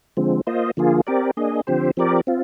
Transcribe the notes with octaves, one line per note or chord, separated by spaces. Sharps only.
D3 F3 G#3 C4
A#3 F4 C5 D#5
D3 F3 A#3 F4 G#4
C4 G4 A#4 D5
A#3 D4 G#4 D#5
D3 F3 C4 G4 C5
F3 C4 G4 A#4 D5
C4 F4